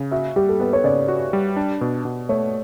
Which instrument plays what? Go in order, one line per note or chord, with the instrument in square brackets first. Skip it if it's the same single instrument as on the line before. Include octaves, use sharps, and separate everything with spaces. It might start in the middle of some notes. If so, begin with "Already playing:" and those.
Already playing: [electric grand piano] C#3
[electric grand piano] F#4 [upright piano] E5
[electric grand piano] G3 [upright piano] G4
[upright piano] A4
[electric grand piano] B3 [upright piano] B4
[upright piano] C#5
[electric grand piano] C#3 [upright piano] D5
[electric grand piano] F#4
G3
D4
B2
B2
[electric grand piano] A3 [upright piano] C#5